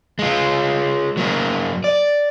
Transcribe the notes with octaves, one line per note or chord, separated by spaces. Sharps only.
G#3 F4
F#3 A#3
D5